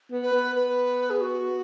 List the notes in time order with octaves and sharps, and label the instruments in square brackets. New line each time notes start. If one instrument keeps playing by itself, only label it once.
[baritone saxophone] B3
[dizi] B4
[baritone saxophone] B3
[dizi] B4
G#4
F#4